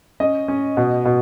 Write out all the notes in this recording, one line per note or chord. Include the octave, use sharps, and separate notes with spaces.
C#4 D#5
C#4
B2
B2